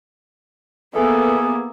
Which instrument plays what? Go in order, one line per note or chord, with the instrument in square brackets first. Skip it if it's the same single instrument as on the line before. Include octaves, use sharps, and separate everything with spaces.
[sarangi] E3 [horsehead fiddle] A#3 B3 [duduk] G#4 [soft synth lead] A4